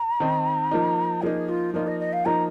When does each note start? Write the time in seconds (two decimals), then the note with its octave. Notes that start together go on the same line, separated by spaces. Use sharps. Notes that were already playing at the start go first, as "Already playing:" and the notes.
Already playing: A#5
0.20 D#3 C4 D#4
0.71 F3 A#3 D#4
1.22 F3 A#3 D#4 G#4
1.49 F4
1.74 F3 A#3 D#4 F4
1.87 D#5
2.00 D#5
2.13 F5
2.25 F3 A#3 D#4 A#5